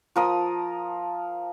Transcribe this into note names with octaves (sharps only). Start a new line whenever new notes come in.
F3 A#4 D#6